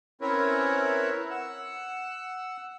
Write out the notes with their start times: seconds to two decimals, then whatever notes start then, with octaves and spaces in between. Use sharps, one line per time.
0.21 C4 C#4 E4 A#4 B4 C#5
1.31 F#5 E6